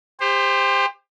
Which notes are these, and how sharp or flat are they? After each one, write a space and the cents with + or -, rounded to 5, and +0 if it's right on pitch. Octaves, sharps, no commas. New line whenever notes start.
G4 +30 C5 +0